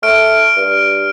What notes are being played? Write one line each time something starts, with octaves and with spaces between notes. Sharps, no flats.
A3 F6 D7
G2